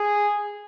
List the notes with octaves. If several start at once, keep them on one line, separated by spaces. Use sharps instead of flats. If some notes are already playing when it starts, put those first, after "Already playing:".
Already playing: G#4